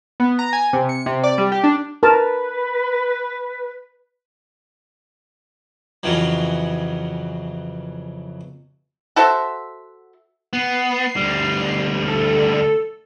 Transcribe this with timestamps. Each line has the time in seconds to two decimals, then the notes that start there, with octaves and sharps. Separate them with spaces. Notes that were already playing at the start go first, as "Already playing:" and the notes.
0.20 B3
0.39 A#5
0.53 G#5
0.73 C3
0.89 C#7
1.06 C3
1.24 D5
1.38 G3
1.52 G4
1.64 D4
2.03 A#4 B4 A5
6.03 F2 C#3 E3 F#3
9.16 F#4 A4 C5 E5
10.53 B3 C7
11.16 D2 G3
12.08 A4